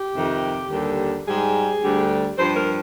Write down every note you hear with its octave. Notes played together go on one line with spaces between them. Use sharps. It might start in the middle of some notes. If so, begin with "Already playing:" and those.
Already playing: G4
F2 C3 D#3
D#2 D3 G3
G#2 G3 G#4
D2 D3 G3
G2 F3 C5
A#4